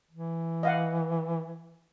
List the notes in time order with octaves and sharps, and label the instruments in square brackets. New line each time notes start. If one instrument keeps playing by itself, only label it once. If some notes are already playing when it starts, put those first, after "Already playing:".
[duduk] E3
[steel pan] D#5 F5 F#5